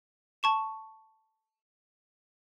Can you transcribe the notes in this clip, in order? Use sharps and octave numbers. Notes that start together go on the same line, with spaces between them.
A5 C#6 E7